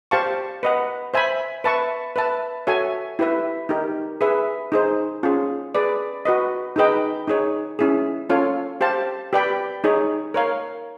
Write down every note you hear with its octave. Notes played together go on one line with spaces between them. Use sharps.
G4 C5 F5 A5 C#6
B4 D#5 F#5
C5 E5 G#5 B5
B4 E5 A5 C#6
B4 E5 A5
F#4 A4 C#5 E5 G#5
E4 G4 B4 E5
D#4 G4 A#4
G#4 B4 E5
D#4 G#4 C5
C#4 F4 G#4
G#4 B4 D5
F#4 B4 D#5
D#4 G#4 B4 D#5 G5
D#4 G#4 C#5
C#4 E4 G#4
C#4 F4 A4 C#5 F5
G4 C5 F5 A5
G4 B4 D5 G5 B5
D#4 G#4 C#5
A#4 C#5 F5